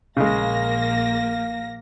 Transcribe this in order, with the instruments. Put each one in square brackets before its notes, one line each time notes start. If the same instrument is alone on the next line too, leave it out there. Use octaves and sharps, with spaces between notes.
[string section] A#1 A#3 A#6 [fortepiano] C#3 G#3 [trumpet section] F5